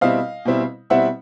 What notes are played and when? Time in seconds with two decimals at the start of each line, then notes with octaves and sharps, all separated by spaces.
0.01 B2 G3 C4 E4 D#5 F5
0.45 B2 G3 C4 E4
0.90 B2 G3 C4 E4 E5 F#5